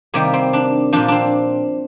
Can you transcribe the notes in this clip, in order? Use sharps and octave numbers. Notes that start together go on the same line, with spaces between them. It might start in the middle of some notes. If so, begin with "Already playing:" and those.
C3 D#3 G3 A#3
C4
D4
A#2 F3 D4
C4 D4